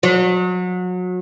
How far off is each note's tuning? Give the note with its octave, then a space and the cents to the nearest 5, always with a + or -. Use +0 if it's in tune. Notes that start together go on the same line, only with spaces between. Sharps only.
F#3 -30